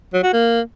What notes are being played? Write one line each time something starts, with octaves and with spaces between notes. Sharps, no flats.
F#3
F#4
A#3